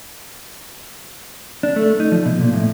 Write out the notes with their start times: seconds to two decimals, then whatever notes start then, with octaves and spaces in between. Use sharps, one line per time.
1.63 D4
1.76 A3
2.00 D#4
2.12 F3
2.26 B2
2.41 A#2
2.54 A2